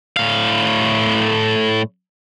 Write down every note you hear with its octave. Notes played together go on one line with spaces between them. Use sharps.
A2 F5